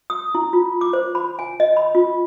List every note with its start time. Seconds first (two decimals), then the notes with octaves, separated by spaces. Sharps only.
0.10 D#6
0.35 E4
0.53 F4
0.81 D6
0.93 C5
1.15 B5
1.39 G#5
1.60 D#5
1.77 B5
1.95 F4